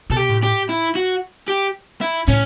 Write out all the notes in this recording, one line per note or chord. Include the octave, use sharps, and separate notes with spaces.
B2 A4
G4
A2
G4
E4
F#4
G4
E4
A2 C#4